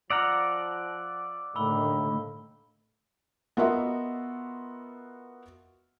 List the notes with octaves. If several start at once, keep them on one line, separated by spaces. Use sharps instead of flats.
F3 D5 F#5 A#5 E6 F6
D#2 A2 D3 A3 B5 E6 G7
B3 F4 F#4 A#4 D#5 E5